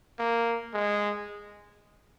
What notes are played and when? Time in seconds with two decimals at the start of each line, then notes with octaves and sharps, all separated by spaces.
0.19 A#3
0.74 G#3